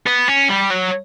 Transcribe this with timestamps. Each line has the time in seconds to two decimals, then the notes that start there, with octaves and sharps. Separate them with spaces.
0.06 B3
0.28 C#4
0.49 G3
0.70 F#3